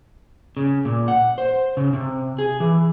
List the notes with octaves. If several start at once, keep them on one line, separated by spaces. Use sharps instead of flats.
C#3
A#2
F#5
C5
C#3
C3
G#4
E3